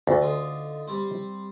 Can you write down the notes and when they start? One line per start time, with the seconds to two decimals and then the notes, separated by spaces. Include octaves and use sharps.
0.07 D2 A4
0.22 D3 D#4 F4
0.88 G3 C4 C5